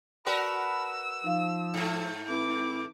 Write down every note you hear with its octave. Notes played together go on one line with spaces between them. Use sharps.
F#4 A#4 B4 D5 A5 B5 E6
F3 D#4 F5
G#2 A3
E3 C4 E4 D6